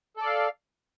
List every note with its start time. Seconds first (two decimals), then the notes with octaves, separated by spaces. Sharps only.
0.17 A4
0.21 D5
0.26 F5